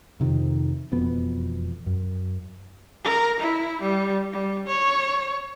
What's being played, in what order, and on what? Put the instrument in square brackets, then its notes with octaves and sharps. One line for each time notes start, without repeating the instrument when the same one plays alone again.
[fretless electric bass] F2 C3 D#3 F3
E1 F2 B2 B3
F#2
[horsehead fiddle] A#4
E4
G3
G3
C#5